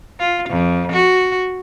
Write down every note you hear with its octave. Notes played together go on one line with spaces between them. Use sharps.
F4
F2
F#4